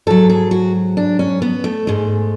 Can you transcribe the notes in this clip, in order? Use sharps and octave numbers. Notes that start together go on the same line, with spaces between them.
G#2 F#3 A4
G#4
F#4
D4
C#4
B3
A3
G#2 G#3